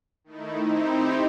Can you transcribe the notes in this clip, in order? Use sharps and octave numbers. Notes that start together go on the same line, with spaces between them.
D#3 A3 D#4 E4
C4 D#4 E4 G4